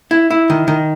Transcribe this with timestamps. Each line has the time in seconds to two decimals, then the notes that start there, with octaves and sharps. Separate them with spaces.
0.11 E4
0.30 E4
0.50 D#3
0.68 D#3